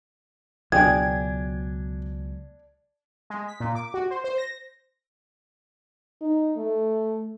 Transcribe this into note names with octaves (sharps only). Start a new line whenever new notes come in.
C#2 B2 F#3 D4 G#4 G5 G#6
G#3
B6
A#2
D6
F#4
C5
C5
A#6
D#4
A3